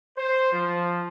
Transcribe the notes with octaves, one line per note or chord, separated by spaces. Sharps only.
C5
F3